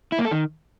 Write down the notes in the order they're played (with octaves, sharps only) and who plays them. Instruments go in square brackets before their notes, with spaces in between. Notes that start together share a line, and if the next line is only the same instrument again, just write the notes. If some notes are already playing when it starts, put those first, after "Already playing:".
[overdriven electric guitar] E4
A#3
A4
D#3